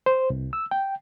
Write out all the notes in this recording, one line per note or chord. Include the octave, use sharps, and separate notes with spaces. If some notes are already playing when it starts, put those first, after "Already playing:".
C5
C2
E6
G5